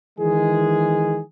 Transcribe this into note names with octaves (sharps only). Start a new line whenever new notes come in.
D#3 E3 G#3 G#4